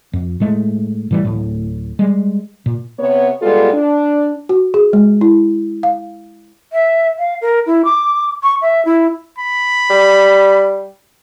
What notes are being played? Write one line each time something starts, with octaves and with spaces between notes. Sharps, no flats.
F2
A2 G#3 A3
A2 E3 G3
D1 A2
G3 G#3
A#2
C3 B3 C#5
B2 G3 G#3 B3 F4 A4
D4
F#4
G#4
G#3
E4
F5
E5
F5
A#4
E4
D6
C#6
E5
E4
B5
G3